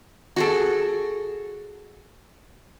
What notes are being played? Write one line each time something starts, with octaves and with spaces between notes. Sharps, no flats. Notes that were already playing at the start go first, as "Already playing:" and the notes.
F#4 G#4 A4